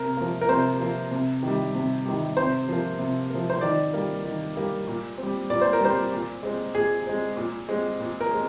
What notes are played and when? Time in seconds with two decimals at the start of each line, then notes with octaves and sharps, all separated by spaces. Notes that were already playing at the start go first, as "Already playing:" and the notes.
Already playing: C3 A#4
0.17 F3 A#3
0.41 A#4
0.48 C3 C5
0.80 F3 A#3
1.11 C3
1.43 D#3 G3
1.75 C3
2.05 D#3 G3
2.37 C3 C5
2.68 F3 A#3
2.99 C3
3.30 F3 A#3
3.50 C5
3.61 D#3 D5
3.94 G3 A#3
4.24 D#3
4.56 G3 A#3
4.87 A#2
5.18 C4
5.23 G3
5.50 A#2 D5
5.61 C5
5.73 A#4
5.81 G3 C4 C5
6.12 A#2
6.43 G#3 C4
6.75 A#2 G#4
7.06 G#3 C4
7.37 A#2
7.69 G#3 C4
8.00 A#2
8.21 A#4
8.31 G#3 C4